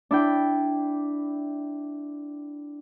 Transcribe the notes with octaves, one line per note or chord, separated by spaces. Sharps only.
D4 E4 G5